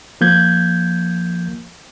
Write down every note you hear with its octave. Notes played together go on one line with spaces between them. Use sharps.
F3 A#3 G6 G#6